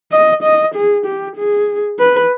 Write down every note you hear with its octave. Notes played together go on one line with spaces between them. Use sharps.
D#5
D#5
G#4
G4
G#4
B4